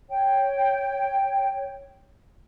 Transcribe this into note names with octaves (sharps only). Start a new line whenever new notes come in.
C#5 G5